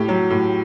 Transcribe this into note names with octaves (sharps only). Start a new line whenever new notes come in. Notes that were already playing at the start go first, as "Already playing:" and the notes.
Already playing: A2 G4
F#3
A2